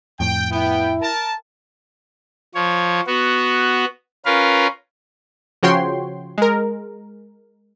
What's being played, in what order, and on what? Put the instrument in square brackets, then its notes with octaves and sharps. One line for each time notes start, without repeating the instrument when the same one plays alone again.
[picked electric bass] F2 A2 [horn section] G5
[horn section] B3 G5 [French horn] E4
[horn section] A#4 A5
[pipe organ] F3 C#5
B3 F#4
C#4 F4 A#4 B4 F5
[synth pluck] C#3 F3 F#4 C#5 G5 C6
G#3 A#4